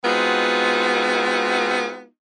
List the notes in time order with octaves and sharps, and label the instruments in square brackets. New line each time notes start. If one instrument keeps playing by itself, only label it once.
[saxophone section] G#3 B3 C4 D#4 F4 F#4